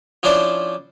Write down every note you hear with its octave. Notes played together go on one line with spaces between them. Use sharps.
F3 C#4 D4 E4 C5 D5